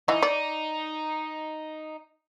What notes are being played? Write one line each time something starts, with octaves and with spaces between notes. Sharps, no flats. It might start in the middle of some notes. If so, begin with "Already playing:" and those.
E3 D#4 D#5
D5